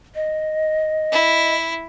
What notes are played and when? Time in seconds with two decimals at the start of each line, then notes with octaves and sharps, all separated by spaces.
0.15 D#5
1.12 E4